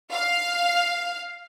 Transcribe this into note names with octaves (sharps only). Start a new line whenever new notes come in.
F5